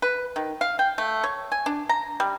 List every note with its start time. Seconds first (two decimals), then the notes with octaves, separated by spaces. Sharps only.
0.02 B4
0.36 D#3
0.61 F5
0.79 G5
0.98 A3
1.24 C#5
1.52 G#5
1.66 D4
1.89 A#5
2.20 G3